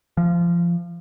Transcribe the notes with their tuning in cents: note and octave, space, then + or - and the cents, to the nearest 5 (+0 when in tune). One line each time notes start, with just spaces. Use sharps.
F3 -20